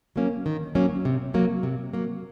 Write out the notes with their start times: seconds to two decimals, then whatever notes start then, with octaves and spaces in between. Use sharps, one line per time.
0.16 F#3 A#3 C#4
0.46 D#3
0.75 F#3 A#3 C#4
1.05 C3
1.34 F#3 A#3
1.63 C3
1.93 F#3 A#3